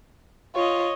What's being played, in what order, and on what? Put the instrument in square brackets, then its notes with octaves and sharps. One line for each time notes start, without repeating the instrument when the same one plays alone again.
[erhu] F4 [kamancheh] C#5 D#5